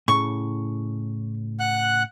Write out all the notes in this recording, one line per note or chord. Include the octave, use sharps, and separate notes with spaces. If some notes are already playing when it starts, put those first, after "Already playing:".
A2 C#3 C#6
F#5 F#6